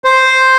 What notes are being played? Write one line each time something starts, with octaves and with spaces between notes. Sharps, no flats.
C5